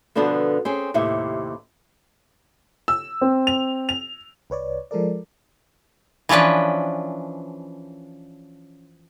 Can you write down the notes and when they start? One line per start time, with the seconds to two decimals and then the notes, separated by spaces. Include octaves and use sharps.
0.15 B2 D3 F3 B3 D4 A4
0.65 C4 C#4 G#4
0.94 D#2 A2 C3 E4 E5
2.88 E6
3.21 C4
3.47 F7
3.89 F7
4.50 C2 B4 C#5 D5
4.91 F3 G#3 A4 A#4 D5
6.29 E3 F3 C#4 D4 B4